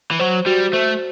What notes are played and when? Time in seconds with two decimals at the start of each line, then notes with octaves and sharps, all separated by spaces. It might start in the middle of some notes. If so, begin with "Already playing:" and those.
0.11 E3
0.20 F#3 C5
0.46 G3 F#4
0.73 A3 C5